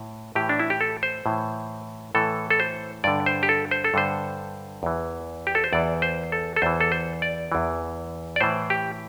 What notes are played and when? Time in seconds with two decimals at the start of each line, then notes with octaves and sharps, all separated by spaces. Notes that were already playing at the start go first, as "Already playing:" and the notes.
Already playing: A2
0.35 A2 E3 G4
0.49 D4
0.59 E4
0.70 G4
0.81 A4
1.03 C5
1.26 A2 E3
2.15 A2 E3 A4
2.50 A4
2.60 C5
3.04 G2 D3 D5
3.26 C5
3.43 G4
3.49 A4
3.71 C5
3.84 A4
3.94 G2 D3 C5
4.83 E2 E3
5.47 G4
5.55 A4
5.64 C5
5.73 E2 E3 D5
6.02 C5
6.32 A4
6.56 A4
6.62 E2 E3 C5
6.80 A4
6.92 C5
7.22 D5
7.52 E2 E3
8.36 D5
8.41 A2 E3 C5
8.70 G4